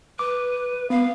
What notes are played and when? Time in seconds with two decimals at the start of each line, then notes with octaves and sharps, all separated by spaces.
0.19 B4 D6
0.90 B3 F5